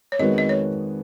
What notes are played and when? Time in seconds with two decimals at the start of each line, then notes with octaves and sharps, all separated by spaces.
0.12 C#5
0.19 F2 D#3 G#3 B3 F#4 D#5
0.38 D#5
0.49 C#5